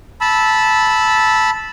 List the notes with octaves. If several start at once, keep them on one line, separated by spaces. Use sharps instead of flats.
A5 B5 E6